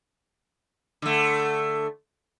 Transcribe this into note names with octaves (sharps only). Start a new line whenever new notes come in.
D3 A3